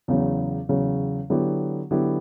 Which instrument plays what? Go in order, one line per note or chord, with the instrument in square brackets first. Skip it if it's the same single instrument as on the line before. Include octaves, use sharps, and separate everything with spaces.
[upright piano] E2 C#3 F#3
E2 C#3 F#3
D3 F#3 B3 E4 G4
D3 F#3 B3 E4 G4